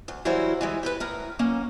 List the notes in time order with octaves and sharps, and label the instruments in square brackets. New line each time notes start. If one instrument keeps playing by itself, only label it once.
[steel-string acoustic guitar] D2
E3 F#3 G3 E4 F#4 C5
E3 G3 G#3
G4 A4 B4
A2 A#4 A#5
F#3 A#3 C#4